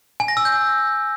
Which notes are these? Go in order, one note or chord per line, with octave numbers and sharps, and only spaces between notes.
G#5
A#6
E6
G6